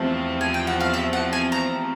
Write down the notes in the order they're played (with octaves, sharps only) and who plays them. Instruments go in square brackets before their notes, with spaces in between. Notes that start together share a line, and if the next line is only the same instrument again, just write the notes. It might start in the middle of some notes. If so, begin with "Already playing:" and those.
Already playing: [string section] E2 C3 F3 A3 C4
[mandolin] G#5
G5
F#5
F5
E5
F#5
G#5
A#5